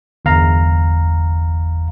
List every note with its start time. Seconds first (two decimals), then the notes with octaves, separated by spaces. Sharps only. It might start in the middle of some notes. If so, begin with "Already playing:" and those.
0.25 G1 E2 F5 A#5